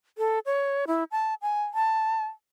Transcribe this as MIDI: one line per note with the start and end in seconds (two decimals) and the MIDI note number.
0.18 0.39 69
0.46 0.85 73
0.87 1.04 64
1.12 1.34 81
1.42 1.64 80
1.74 2.24 81